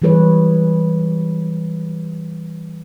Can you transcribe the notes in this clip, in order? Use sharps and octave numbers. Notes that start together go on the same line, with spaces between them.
E3 G3 G#4 B4 C#5